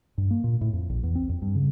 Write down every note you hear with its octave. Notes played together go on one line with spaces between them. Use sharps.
G2
A#3
A#2
A2
F2
A#1
E2
C4
F2
G2
C#3